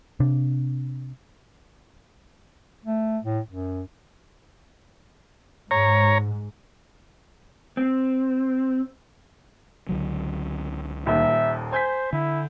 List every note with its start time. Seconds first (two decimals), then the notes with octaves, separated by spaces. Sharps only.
0.20 C3 D4
2.84 A3
3.24 A2
3.49 F#2
5.71 G#2 C#5 A#5
7.77 C4
9.89 C#2 D3 F#3
11.07 D#1 D#2 D#3 E5
11.72 C5 G#5 G6 B6
12.13 D3 E4